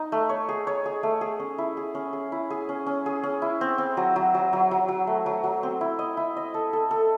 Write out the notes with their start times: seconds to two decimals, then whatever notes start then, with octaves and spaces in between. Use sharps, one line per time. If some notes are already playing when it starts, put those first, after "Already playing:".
Already playing: D#4
0.12 A3
0.29 C#5
0.49 G#4
0.67 C#5
0.86 G#4
1.03 A3
1.21 G#4
1.40 C#4
1.58 E4
1.77 G#4
1.95 C#4
2.13 G#4
2.32 E4
2.50 G#4
2.69 C#4
2.86 C#4
3.06 G#4
3.23 C#4
3.42 E4
3.61 C4
3.78 C4
3.97 F#3
4.16 F#3
4.35 F#3
4.53 F#3
4.71 F#3
4.88 F#3
5.07 A3
5.26 F#3
5.44 F#3
5.63 C4
5.81 E4
5.99 D#5
6.17 E4
6.37 D#5
6.54 A4
6.73 A4
6.91 A4